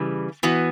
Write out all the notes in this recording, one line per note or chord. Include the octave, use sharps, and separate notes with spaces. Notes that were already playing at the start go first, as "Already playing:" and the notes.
Already playing: C#3 E3 G3
E3 B3 F#4